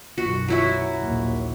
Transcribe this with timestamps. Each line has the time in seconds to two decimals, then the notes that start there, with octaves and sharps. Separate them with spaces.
0.18 B1 F#2 F#4
0.48 F#3 E4 F#4
1.01 A#1 D#2 A#2